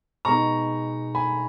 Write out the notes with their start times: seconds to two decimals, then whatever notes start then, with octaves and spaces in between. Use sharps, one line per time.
0.25 B2 G#3 B3 D#4 A#5 C#6
1.15 G#5 B5